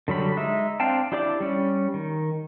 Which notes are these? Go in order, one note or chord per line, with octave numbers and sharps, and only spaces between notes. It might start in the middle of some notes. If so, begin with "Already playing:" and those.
D3 F#3 G3 B5
G#3 D#4 E5
C4 D4 F5 G5 A5
D4 E4 G4 D5 D6
G3 C#4
D#3